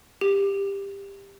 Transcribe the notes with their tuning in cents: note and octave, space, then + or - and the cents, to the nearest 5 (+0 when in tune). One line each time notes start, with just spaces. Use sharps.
G4 +15